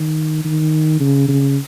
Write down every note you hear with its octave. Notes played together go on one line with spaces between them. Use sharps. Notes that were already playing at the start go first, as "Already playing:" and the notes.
Already playing: D#3
D#3
C#3
C#3